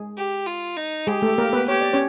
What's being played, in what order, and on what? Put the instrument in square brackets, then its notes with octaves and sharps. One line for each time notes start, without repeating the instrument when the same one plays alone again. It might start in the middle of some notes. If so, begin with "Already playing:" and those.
Already playing: [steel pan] G#3 G#4
[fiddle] G4
F4
D#4
[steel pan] G#3 G#4 [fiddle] G4
[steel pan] A3 A4
A#3 A#4
B3 B4
[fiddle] G4 [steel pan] C#5
[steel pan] D5
C#4 C#5